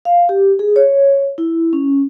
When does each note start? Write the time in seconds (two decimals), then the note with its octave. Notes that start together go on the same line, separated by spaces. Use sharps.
0.05 F5
0.29 G4
0.59 G#4
0.76 C#5
1.38 E4
1.73 C#4